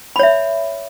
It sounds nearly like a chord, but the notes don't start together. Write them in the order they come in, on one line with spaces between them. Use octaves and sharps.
B5 C#5 E5